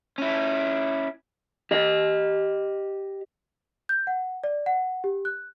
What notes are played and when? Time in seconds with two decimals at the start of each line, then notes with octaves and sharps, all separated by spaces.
0.18 C#4 E4
1.71 G4 D#5
3.89 G6
4.07 F#5
4.44 D5
4.66 F#5
5.04 G4
5.25 F#6